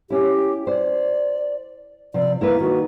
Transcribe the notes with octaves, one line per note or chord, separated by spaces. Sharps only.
C#4 E4 G4
C5 D5
C3 F3 D5
A#3 E4 A#4 B4
D#3 F#4